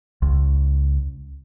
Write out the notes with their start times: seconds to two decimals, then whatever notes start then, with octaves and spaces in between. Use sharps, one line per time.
0.22 C#2